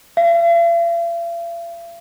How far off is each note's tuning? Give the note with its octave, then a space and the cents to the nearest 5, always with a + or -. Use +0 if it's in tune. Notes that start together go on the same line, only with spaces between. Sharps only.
F5 -45